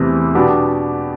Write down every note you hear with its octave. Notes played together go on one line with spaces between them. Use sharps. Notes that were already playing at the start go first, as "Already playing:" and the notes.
Already playing: E2 C3 E3 A3
B2 B3 D4 G4